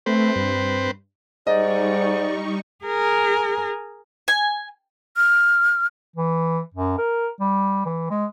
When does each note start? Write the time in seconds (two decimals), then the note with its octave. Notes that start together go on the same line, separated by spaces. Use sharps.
0.06 A3 C4 B4 C5
0.36 G2
1.47 G#2 G3 D#4 D5 D#5 C#6
2.85 G#4 A#4
4.28 G#5
5.17 F6
6.16 E3
6.74 F#2
6.98 A#4
7.40 G3
7.85 E3
8.11 G#3